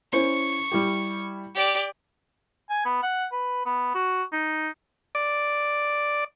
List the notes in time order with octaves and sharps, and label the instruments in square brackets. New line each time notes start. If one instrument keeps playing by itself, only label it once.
[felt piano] C#4 E4 C5 [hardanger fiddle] C#6
[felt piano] G3 E4 G4
[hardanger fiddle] G4 D5
[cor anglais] G#5
B3
F#5
B4
B3
F#4
D#4
[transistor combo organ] D5